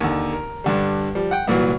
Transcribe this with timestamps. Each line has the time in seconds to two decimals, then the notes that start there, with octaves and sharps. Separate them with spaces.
0.01 D#2 D3
0.33 A#4
0.64 G2 D3 G3
1.15 F3 G3
1.31 F#5 G5
1.47 C2 A#2 E3 F#3